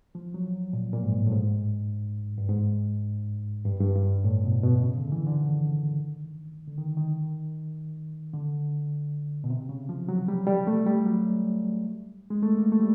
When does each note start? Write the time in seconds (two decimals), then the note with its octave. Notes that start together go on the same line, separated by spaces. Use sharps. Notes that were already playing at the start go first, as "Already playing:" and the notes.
0.15 F3
0.34 F#3
0.73 A#2
0.93 A#2
1.03 G#2
1.13 A2
1.27 A2
1.32 G#2
2.38 G2
2.49 G#2
3.66 G2
3.80 G2
3.95 G2
4.24 A2
4.44 B2
4.63 B2
4.82 C#3
4.97 D3
5.12 E3
5.27 D3
5.41 D#3
6.68 D3
6.78 D#3
6.97 D#3
8.34 D3
9.44 B2
9.50 C3
9.69 C#3
9.89 F3
10.09 F#3
10.28 G3
10.47 G3
10.67 A3
10.87 G3
11.06 F#3
12.30 G#3
12.43 A3
12.57 A#3
12.72 A3
12.80 G3